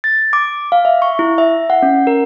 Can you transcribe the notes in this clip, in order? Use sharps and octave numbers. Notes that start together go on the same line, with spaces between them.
A6
D6
F5
E5
C#6
E4
E5
F#5
C#4
A#4